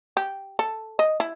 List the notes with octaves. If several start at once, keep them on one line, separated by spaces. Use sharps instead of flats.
G4
A4
D#5
E4